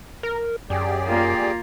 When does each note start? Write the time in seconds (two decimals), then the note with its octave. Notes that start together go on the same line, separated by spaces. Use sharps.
0.23 A#4
0.70 F#2 G4 G#4 D5
1.08 A#3 F4